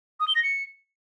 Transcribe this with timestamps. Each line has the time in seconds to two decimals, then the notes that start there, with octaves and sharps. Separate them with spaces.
0.20 D#6
0.28 G7
0.35 A#6
0.43 C#7